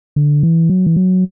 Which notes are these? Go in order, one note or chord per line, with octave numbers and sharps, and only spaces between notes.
D3
E3
F#3
E3
F#3